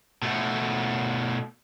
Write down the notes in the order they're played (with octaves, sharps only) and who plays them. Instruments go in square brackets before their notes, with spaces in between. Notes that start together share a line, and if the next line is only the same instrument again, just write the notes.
[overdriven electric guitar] B2 A3